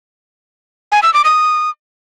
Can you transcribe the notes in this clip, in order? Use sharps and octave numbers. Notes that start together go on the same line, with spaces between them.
G#5
E6
D6
D#6